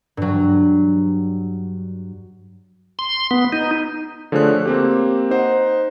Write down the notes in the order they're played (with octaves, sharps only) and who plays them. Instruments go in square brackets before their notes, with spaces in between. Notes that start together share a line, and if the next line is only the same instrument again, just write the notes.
[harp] G2 F#3
[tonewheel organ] C6
B3
D#4
[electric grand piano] D3 F3 A3 G#4 C#5 F#6
A#3 C4 G4
D#4 C5 F#5